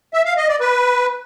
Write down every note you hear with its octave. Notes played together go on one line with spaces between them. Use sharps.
E5
F5
D#5
D5
B4